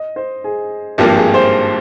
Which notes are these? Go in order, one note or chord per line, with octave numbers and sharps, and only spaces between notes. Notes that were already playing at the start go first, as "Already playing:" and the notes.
Already playing: D#5
C5
G#4
G#1 G2 F3 A#3 G4
G#4
C5